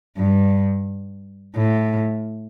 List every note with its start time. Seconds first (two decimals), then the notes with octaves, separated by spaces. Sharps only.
0.18 G2
1.56 A2